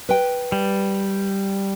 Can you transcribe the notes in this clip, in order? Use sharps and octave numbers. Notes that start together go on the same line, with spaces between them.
B4 G5
G3